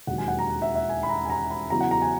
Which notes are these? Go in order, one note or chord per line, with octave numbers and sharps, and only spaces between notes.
E1 D#2 D#3 F#3 F#5
G#5
F#5
A#5
E5
E5
G#5
B5
A#5
G#5
A#5
B5
E2 C#3 F#3 A#5
F#5
A#5
G#5